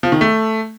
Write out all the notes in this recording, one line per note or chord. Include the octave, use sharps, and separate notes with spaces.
F3
D#3
A3